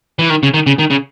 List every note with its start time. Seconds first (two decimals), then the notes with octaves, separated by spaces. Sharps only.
0.19 E3
0.30 D#3
0.43 C#3
0.54 D#3
0.67 C#3
0.79 D#3
0.90 C#3